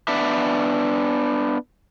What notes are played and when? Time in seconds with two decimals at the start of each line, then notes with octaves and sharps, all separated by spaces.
0.08 B3 D4 E5